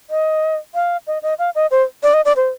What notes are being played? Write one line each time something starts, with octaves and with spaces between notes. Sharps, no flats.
D#5
F5
D#5
D#5
F5
D#5
C5
D5
D#5
D5
C5